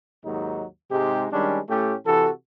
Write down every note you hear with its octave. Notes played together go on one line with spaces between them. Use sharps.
D#2 G#2 F#3 D#4
G#2 C3 G#3 D#4 G4
D#3 G3 G#3 C#4 D4
A2 A3 C#4 G4
C3 E3 F#4 A4